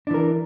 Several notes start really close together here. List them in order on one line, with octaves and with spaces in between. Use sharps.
D4 E3 A#4